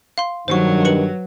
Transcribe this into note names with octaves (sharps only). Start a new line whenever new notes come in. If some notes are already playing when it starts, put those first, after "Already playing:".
F5 C6
G2 D#3 F#3 C5 C#6
B4 C#7 F#7